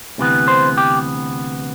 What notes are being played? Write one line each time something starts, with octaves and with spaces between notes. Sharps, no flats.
D2 C3 E3 B3
C5
G4